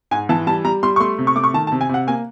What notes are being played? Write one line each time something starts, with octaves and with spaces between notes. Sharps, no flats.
G#2 G#5
E3 A5
G3 A5
G3 A#5
G3 C6
C#6
A3 C6
C3
C#6
A3 D6
C#6
D#3 A5
A5
C3
G#5
C3 F#5
A#3 G#5